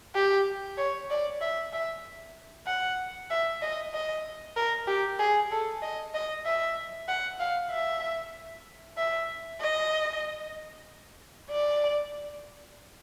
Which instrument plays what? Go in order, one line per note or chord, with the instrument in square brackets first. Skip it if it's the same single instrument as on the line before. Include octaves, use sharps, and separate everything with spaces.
[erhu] G4
C#5
D5
E5
E5
F#5
E5
D#5
D#5
A#4
G4
G#4
A4
D#5
D#5
E5
F#5
F5
E5
E5
D#5
D5